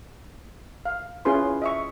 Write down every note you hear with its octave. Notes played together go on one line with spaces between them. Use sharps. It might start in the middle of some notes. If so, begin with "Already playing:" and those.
F5
C#4 E4 F4 G#4 B4 C6
D#5 E5 C#6